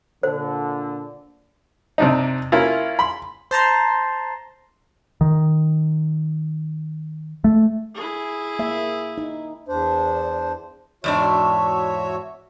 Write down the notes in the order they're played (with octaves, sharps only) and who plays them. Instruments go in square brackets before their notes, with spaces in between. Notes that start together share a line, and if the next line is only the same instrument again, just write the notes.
[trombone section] A#2 D3 [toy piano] C5
[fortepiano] C3 D4 D#4
A#3 C#4 E4 F4
B5 C6
[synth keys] C5 A5 A#5 C6
[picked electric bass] D#3
A3
[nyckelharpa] E4 G#4
[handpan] A#3 E5
D#4
[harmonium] E2 D4 C5
[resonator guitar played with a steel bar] E2 G#2 D4 [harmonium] F#4 C#5 E5